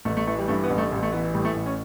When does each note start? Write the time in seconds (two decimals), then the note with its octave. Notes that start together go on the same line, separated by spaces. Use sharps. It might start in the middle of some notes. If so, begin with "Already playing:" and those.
0.05 A1 A3
0.17 A3
0.27 E3 A3
0.38 G3
0.48 G2 A3
0.63 B3
0.70 A1
0.78 A3
0.92 A1 G3
1.03 A3
1.12 E3 B3
1.34 A2 G3
1.45 A3
1.56 A1
1.66 C#4